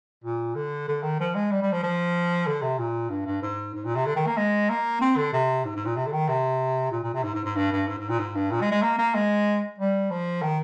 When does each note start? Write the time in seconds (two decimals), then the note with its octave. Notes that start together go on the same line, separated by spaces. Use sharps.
0.24 A#2
0.55 D3
0.88 D3
1.03 D#3
1.20 F3
1.35 G#3
1.51 G3
1.62 G3
1.72 F3
1.83 F3
2.47 D3
2.62 C3
2.79 A#2
3.10 G2
3.26 G2
3.42 G#2
3.74 G#2
3.85 A#2
3.95 C3
4.06 D3
4.16 D#3
4.27 A#3
4.37 G#3
4.70 A#3
5.01 C4
5.17 D3
5.33 C3
5.65 G#2
5.76 G#2
5.86 A#2
5.96 C3
6.06 D3
6.12 D#3
6.28 C3
6.92 A#2
7.03 A#2
7.14 C3
7.23 G#2
7.34 G#2
7.45 G#2
7.56 G2
7.72 G2
7.88 G#2
7.98 G#2
8.09 A#2
8.19 G#2
8.35 G2
8.51 A#2
8.62 G#3
8.72 G#3
8.82 A#3
8.99 A#3
9.15 G#3
9.79 G3
10.11 F3
10.42 D#3